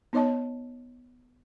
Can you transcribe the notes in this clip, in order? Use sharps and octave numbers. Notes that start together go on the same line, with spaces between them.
B3 D#4 C#5 D#5 A5